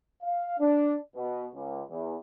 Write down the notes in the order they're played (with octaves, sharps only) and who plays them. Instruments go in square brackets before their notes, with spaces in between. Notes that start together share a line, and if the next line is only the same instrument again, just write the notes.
[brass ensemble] F5
D4
B2
C#2
E2